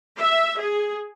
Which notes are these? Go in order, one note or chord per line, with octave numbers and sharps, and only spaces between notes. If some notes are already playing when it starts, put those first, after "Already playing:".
E5
G#4